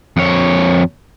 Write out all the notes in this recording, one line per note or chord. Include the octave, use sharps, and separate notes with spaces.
F2 C#5